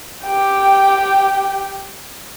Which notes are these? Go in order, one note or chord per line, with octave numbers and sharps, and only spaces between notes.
G4 G5